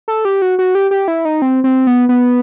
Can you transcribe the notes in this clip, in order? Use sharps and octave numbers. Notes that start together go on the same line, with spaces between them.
A4
G4
F#4
F#4
G4
G4
E4
D#4
C4
C4
B3
B3